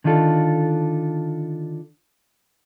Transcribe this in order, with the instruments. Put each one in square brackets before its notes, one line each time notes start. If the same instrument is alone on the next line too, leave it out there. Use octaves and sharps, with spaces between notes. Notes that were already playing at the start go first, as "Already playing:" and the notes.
[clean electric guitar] D3 D#3 D4 F4 A4